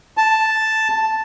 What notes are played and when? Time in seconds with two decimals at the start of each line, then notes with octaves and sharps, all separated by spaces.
0.17 A5